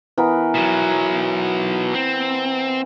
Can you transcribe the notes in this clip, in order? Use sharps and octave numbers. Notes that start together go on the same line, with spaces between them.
E3 B3 A#4
B2 F#3
C4